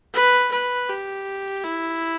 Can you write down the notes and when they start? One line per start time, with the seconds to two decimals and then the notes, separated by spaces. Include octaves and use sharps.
0.14 B4
0.52 B4
0.89 G4
1.65 E4